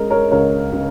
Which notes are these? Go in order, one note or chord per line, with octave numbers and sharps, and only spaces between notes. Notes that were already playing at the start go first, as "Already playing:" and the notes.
Already playing: G#3 C#4 A#4 D#5
A#4 C#5
C#2 A#4 C#5
C#3